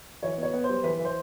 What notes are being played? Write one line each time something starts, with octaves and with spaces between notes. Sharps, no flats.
E3 C#5
B3
C#5
B3
G3 C5
E3 B4
E3
C5